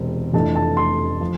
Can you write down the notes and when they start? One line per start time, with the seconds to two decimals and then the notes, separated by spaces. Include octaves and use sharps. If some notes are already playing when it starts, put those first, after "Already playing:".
Already playing: E1 E2 C3 G#3 C4
0.33 F1 F2 E3 A3 D4 A5
0.55 A5
0.77 C6
1.21 F3